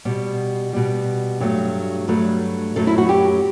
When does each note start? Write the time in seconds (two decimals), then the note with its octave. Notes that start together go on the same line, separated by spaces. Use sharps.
0.05 B2 G3
0.73 B2 G3
1.40 G2 F#3 A3
2.08 G2 F#3 A3
2.76 F#2 F#3 A3 A4
2.87 E4
2.98 F#4
3.09 G4